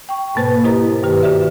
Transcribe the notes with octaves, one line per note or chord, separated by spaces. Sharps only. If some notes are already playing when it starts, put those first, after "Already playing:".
G5 C#6
G#2 B2 A#3 B4 C5
E4 G4 A#4 C5 D#5 A#5
G2 D#3 G4 B4
F#4 G4 C5 D5 E5